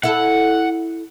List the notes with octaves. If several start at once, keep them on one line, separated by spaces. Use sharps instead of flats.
E4 A4 F#5